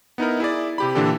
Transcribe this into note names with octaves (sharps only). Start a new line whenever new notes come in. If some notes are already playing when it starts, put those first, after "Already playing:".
B3 D#4 E4 A#4
E4 G#4 D5
C3 G4 B5
A#2 D3 E3 D4 G4 A4